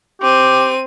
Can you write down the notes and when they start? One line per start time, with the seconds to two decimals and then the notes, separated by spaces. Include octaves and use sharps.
0.22 C4 G4 D#7